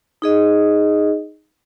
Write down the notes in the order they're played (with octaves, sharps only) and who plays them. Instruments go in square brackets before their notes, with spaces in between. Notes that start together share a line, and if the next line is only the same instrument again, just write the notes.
[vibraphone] D#4 G#4 D#5